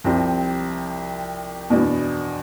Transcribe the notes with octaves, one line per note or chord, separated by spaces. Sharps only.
C2 C3 F3 C4 G4
E2 B2 B3 D4